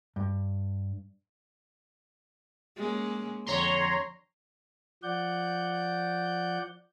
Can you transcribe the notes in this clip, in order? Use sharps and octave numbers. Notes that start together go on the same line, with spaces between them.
G2
G#3 A#3 C#4
F2 D3 C#5 A#5 C6
F3 D5 F#5 G6